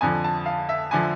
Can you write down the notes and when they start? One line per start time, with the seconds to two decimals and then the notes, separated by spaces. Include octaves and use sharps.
0.01 F2 D3 F3 G#5
0.24 A5
0.46 F5
0.69 E5
0.91 D3 F3 G#5